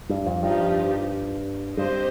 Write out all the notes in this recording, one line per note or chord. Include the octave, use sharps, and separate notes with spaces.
G2
F2
G2 F3 D#4 G4
G2 C4 G4 C5 D#5